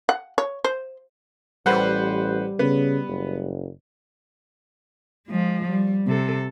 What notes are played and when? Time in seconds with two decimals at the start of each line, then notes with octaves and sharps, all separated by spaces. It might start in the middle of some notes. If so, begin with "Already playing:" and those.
0.09 F#5
0.38 C#5
0.64 C5
1.66 A1 G3 B4 C5 F#5
2.59 C#3 B3
3.08 F#1
5.27 F3 G#3
5.69 G3
6.07 C3 A4